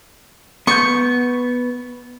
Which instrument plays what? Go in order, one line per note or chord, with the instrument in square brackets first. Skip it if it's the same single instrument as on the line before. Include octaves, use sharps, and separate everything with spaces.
[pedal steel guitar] B3 G6 [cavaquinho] C#6